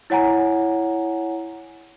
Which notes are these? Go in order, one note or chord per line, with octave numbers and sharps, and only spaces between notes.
E4 C#5 F#5 G#5 A#5